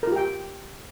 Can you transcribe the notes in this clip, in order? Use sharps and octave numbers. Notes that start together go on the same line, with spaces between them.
F4 G4 A#4 G5